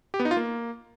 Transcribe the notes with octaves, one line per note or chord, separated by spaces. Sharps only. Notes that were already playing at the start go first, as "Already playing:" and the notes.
G4
B3
D#4
F4
A#3